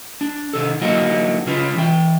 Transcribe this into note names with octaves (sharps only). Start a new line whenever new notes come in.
D4
C3 D#3 A4
D3 F#3 A#3 D#4 E4 F#4
C#3 C#4 F4 B4
E3 G5